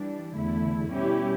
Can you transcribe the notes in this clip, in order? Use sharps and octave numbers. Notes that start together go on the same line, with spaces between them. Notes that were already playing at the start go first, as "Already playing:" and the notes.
Already playing: E3 G3 D4
E2 D3 A3 E4
B2 G3 C#4 E4 G4